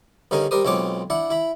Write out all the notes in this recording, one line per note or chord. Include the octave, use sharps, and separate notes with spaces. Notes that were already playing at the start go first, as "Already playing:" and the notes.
G2 D3 C#4 D#4 A#4 G#5
G3 G4 A#4 C5 D#6
B1 G#3 C4 F4 C#5 D6
D4 E4 F#5
E4 B5